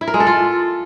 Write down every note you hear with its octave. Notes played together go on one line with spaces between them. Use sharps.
E4
A#4
G#3
A4
F4